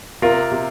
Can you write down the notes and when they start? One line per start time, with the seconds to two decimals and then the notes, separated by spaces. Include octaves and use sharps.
0.22 C3 F4 A#4
0.52 C3